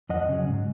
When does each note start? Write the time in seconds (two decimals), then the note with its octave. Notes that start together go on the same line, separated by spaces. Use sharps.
0.09 F2 D#5 F#5
0.29 C#3 F#3
0.48 G#2